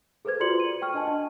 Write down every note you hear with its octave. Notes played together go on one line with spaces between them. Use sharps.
G#4 A4 B4 C5 G#6
F4 F#4 D5 C6 C#7 F#7
D#7
G5 C#6 F6
D4 D#5 G#5 A5
D#5